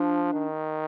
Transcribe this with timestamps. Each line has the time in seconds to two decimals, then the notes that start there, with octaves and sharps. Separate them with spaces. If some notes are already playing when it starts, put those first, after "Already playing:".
Already playing: F3 D4
0.33 D#3